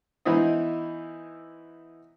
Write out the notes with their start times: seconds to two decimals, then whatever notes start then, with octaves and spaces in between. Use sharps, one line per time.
0.25 E3 B3 D#4 E4 C5 D#5